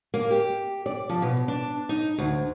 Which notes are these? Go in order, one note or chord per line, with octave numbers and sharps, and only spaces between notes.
A#3
G4
D5
F3
B2
D4
D#4
D2